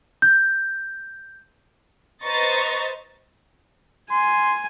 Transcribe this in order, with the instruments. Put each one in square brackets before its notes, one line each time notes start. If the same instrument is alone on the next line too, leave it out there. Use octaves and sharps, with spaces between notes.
[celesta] G6
[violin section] B4 C5 D#5 A#5 C#6 A6
[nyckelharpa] G#5 [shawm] C6